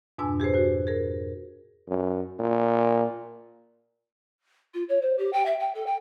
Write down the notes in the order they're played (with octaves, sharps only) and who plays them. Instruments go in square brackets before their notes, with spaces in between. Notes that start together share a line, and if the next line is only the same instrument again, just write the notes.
[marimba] F2 G#2 B2 D4 G#5 E6
G4 G#4 B4 C5
F#4 C5
G#4 A#4
[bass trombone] F#2
A#2
[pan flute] F4
C#5
C5
G4
G5
E5
G5
A4
G5